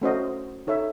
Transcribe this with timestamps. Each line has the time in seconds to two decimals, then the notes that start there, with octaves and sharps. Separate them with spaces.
0.02 A3 C#4 F#4 C5 D#5
0.67 D#4 A4 C#5 E5